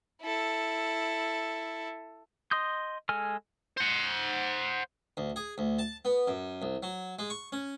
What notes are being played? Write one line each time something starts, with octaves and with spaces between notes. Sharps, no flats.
E4 A4
D#5 C6 D#6 G6
G#3 A4 G#5 F6
C5 F#5
D2
G#4
D2
A5
B3
F#2
C2
F#3
G#3
C#6
C#4